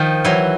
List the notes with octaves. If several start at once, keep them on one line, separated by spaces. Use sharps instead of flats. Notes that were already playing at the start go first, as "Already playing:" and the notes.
Already playing: D#3 F3
E3 F#3